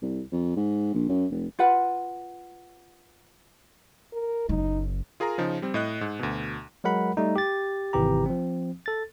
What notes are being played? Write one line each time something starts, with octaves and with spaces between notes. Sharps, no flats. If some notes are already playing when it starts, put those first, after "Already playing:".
C2
F2
G#2
A#1
F#2
F1
F4 B4 F#5
A#4
F#1 F#3 D#4
F4 G#4 A#4 G#5 A#5
C#3 F3 D#4
G3 C4
A2 D#5 F#6
G#2
D2 B2
F#3 G#3 A#4 F#5 B5
G3 A3 D#4
G4 A6
G#1 C3 E3 G4 A#5
F3 C4
A4 A6